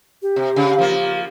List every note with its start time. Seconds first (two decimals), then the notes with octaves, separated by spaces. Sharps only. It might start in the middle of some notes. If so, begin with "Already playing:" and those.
0.22 G4
0.36 C3
0.56 C#3
0.78 F3 A#3